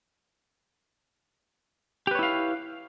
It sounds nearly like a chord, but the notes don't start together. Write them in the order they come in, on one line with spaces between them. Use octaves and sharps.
G4 B4 C#5 E4 F5